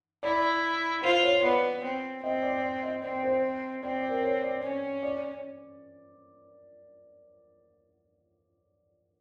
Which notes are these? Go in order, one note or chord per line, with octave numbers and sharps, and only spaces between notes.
E4 D5
F4 C5
C#5
B3 D5
C4
C4 D#5
D5
D5
D#5
C4 D5
C5
C4 D5
D5
A#4
C#5
D5
C#4
D5